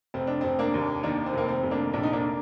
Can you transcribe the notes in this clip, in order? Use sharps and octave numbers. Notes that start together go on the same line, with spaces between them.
F1 C4
D4
F1 C4
A#3 D4
D#2
D#3 A#3 D4
C4
F1 A#3
C4
F1
A#3 D4
A#1 D4
D#4
A#3 D4